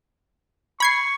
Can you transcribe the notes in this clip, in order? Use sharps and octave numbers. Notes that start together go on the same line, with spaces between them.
B5 C#6 G#6 C7